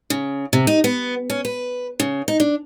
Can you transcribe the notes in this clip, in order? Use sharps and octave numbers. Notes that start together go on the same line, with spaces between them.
C#3
C3
D#4
B3
C#4
B4
C#3
D#4
D4